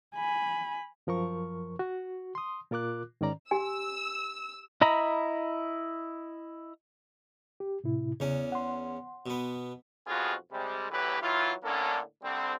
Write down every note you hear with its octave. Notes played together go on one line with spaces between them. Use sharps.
G#5 B5
F#2 F3 A#4 C#6
F#4
C6 D#6
A#2 F4 A#4 D6 F#6
G#2 D#3 C#4 D5 A#5
G4 G#5 E6
E4 D#5 A#5 B5
G4
A2 C3 E4
E2 C#3 C#4
F#5 C6
B2 B3
B1 F2 B2 F4 F#4 G#4
C3 G3 G#3
D2 A2 E3 F#3 G4 B4
E3 F#3 E4 F4
A2 D3 A#3 C#4 D4 A4
C2 D3 G3 C4